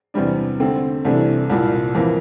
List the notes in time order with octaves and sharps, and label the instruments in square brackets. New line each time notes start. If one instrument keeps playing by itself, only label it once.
[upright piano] E2 C3 G3 D4
D3 A3 C4
C2 C3 E3 A3 D4
C2 A#2 G3
F2 E3 A#3